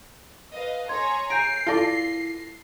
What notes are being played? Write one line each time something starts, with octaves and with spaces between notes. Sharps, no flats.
B4 D#5 F5
G#4 C#5 A#5 C6 G#6
G#5 A#5 G6 C7 D7
E4 F4 A4 D5 A#6